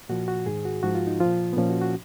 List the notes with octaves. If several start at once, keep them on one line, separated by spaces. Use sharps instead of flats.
A#2 F3 F#4
F#4
G#2 D#3 G#4
F#4
G#2 F3 F#4
F4
D#4
A#2 F3 F4
B3
A#2 F3 C#4
F#4
F#4